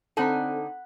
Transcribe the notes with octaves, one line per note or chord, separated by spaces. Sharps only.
D3 C4 D#4 A4 F#5 G#5 B5